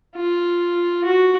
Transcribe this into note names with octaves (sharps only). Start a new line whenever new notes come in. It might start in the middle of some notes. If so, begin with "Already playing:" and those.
F4
F#4